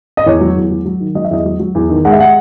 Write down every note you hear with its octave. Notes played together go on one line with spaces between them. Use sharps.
D#5
E2 C#5
F#3
E2
F#3
F#3
D#3
F#3 D#5
E5
E2 D#5
F#3
F#3
E2
D#3
G#3 F#5
E5
G#3 F#5